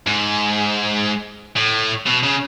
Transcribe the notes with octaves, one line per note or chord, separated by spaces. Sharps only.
G#2
A2
B2
C#3